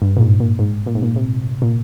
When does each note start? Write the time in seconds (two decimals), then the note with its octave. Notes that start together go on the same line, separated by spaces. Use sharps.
0.02 G2
0.17 A#2
0.20 G#2
0.40 A#2
0.59 G#2
0.86 A#2
0.95 G#2
1.03 A#2
1.16 C3
1.62 A#2